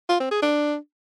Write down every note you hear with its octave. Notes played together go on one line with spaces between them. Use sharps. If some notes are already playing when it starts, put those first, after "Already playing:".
F4
C4
G#4
D4